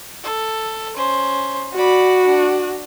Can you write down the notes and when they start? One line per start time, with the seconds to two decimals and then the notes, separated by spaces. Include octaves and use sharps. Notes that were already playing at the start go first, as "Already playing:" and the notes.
0.23 A4
0.96 C#4 C5
1.76 F#4 D5 B5
2.25 D4